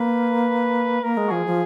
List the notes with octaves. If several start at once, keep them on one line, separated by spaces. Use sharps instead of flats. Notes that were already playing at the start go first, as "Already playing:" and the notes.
Already playing: A#3 B4
A#3 A#4
G#3
F#4
F3 G#4
F3